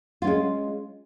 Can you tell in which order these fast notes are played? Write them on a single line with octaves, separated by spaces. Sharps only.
F4 C#4 G#3